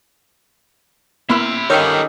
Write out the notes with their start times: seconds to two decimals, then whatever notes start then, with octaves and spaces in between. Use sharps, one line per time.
1.29 A#3 B3 E4 E5 C6 E6
1.70 D#3 C#4 D#4 G4 A4 C#5 F5 G5